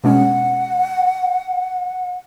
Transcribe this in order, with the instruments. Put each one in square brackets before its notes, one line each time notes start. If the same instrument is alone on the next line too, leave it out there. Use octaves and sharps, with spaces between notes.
[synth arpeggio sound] B2 G#3 C#4 [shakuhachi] F#5